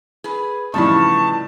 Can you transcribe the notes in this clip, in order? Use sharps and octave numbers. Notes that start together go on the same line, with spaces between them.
G#4 B4
A2 C#3 E3 F3 G3 D#4 A5 C#6